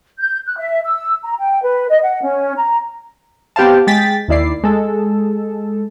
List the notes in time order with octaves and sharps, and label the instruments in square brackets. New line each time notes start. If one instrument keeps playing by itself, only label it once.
[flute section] G6
F#6
E5
E6
A#5
G5
B4
D#5
F#5
C#4
A#5
[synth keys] B3 C4 G4 C5 F5 A5
G#3 G5 A6 B6
D#2 D#3 E4 D5 C7
G#3 A4